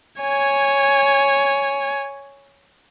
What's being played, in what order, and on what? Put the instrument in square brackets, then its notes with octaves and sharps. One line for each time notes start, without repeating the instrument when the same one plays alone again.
[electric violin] C#5 G#5